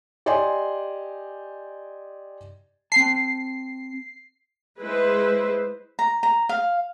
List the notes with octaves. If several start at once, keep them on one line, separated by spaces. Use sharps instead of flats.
G4 D5 D#5 G#5 C6
C4 A5 C7
G#3 E4 B4 C5
A#5
A#5
F5